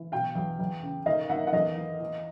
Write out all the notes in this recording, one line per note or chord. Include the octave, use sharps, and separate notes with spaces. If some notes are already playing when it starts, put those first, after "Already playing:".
Already playing: E3
B2 F5 G5
E2
E2
C#3
D#3 D#5 F5
D#3 E5 F#5
F#5
E2 D#5 F5
E3
E3